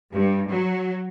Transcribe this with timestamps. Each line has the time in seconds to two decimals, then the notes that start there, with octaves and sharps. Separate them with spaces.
0.12 G2
0.50 F#3